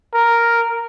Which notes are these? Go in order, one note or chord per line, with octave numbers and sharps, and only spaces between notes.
A#4